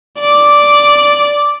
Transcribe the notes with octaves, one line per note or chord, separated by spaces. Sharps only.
D5 D6